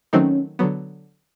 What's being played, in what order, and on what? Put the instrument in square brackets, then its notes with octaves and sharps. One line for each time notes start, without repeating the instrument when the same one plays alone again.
[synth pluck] D#3 F#3 A3 C4 D#4 [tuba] C#4
[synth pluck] D3 F#3 B3